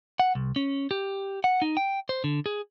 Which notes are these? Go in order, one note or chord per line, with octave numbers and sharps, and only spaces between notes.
F#5
C2
C#4
G4
F#5
D#4
G5
C5
D3
G#4